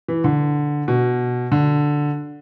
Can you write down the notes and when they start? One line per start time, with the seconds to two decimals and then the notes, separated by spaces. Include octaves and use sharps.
0.08 E3
0.24 D3
0.88 B2
1.52 D3